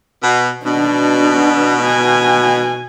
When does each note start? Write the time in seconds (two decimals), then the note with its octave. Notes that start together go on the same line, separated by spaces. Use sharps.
0.23 B2
0.65 B2 D4
1.83 G#5